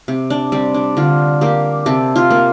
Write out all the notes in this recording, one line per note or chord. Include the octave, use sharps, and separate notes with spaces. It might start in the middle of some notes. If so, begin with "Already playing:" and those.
C3
D4
G3 C4
D4
D3 F4
A#3 G4
C3 A4
F4
A#3